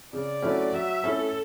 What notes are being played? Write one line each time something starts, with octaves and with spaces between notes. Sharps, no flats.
C#3 D5
F#3 A3 C#4 E4
F#3 E5
A3 C#4 E4 A4